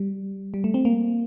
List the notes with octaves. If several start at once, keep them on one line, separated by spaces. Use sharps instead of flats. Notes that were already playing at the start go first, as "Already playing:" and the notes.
Already playing: G3
G3
A3
C4
A#3